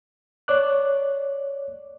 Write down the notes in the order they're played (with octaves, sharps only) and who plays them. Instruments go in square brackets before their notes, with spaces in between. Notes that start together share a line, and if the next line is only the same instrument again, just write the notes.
[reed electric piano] C#5 D5 D6 F#6